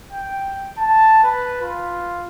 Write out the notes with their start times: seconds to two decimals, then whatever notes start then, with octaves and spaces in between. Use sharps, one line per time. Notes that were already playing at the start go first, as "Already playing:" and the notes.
0.13 G5
0.78 A5
1.23 B4
1.62 F4